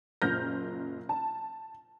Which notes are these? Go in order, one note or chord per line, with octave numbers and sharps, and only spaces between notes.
F#1 A#2 F6 G6 A#6
A5